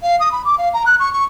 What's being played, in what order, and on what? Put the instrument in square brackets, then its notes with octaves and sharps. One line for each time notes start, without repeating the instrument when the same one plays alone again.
[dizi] F5
D#6
B5
D6
F5
A#5
F#6
C#6
C#6